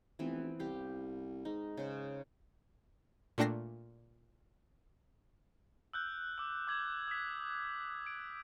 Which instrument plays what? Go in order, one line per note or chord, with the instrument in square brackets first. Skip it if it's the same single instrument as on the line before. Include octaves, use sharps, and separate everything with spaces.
[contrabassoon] F1 [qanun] E3 B3 C4
[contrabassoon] C2 [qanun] G4 F5
[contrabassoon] G#2 [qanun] D#4
[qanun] C#3 C5
[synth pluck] A#2 A3 D4 G5 A#6 C7
[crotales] E6 F#6 G6
D6 E6
D6 G#6 F#7
D#6 B6
D7